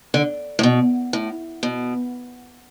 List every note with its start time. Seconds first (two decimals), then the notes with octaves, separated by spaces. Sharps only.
0.14 D3
0.59 A2
0.63 B2
1.13 A2
1.63 B2